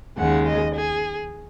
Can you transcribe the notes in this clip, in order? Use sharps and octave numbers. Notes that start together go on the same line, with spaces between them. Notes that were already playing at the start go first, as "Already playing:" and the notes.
D#2 C#3 G#3 F#5
D#5
G#4